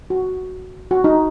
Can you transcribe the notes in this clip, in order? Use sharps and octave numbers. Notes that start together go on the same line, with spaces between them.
F#4
F#4
D#4